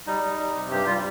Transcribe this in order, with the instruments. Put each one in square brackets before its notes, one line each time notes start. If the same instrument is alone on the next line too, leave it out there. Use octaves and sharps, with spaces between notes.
[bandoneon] G3 D#4
G3
G3
C3
G2 G4
G3 F4